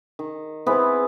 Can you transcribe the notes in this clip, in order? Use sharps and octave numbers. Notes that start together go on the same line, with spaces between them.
D#3
B3 C4 E4 G#4